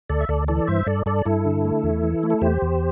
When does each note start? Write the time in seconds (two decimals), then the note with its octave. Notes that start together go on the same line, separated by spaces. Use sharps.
0.10 D2 A4 D5
0.21 E5
0.29 D2 A4 D5
0.48 E3 A4 D5
0.67 G2 C5 E5
0.87 G2 A4 D5
1.06 G2 A4 D5
1.25 G2 E4 A4
1.45 D3
1.65 A3
1.83 E2
2.03 E3
2.23 A3
2.30 A4
2.42 E2 G4 C5
2.62 E2